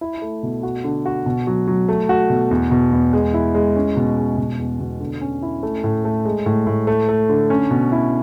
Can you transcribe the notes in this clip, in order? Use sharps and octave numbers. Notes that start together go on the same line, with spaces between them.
E4
A3
B2
F#4
D3
F#4
B2
F#3
F#3
A3
F#4
B2
E2
B2
E2
G#3
E4
G#3
C#4
B2
G#3
B2
E2
B2
D3
C#4
E4
A3
A2
A3
G#3
A2
A2
A3
A3
D3
C#4
B2
E4